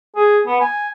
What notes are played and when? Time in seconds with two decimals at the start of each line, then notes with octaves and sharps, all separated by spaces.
0.16 G#4
0.46 B3
0.61 G#5